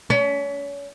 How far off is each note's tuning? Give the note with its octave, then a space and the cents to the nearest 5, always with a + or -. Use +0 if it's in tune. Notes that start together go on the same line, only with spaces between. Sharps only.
C#4 +35